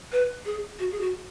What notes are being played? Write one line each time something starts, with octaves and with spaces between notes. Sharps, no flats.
B4
G#4
F#4
G#4
F#4